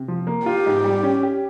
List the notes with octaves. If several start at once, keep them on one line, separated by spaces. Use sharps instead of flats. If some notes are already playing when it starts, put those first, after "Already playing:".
Already playing: C3
F3
A#3
F4 G4
G#2
G3
C#4
G4